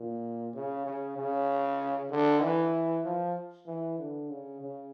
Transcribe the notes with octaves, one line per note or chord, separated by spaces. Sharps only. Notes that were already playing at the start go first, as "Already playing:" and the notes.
Already playing: A#2
C#3
C#3
C#3
D3
E3
F3
E3
D3
C#3
C#3